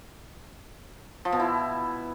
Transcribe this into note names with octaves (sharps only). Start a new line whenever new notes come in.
F3
B2
E4